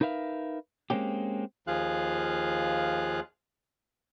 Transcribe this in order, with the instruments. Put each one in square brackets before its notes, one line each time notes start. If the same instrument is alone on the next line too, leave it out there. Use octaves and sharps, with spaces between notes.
[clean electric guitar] D#4 A#4 B4 E5 F5
G#3 A#3 C4 C#4 G4
[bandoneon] D#2 F3 F4 G#4 F5 F#6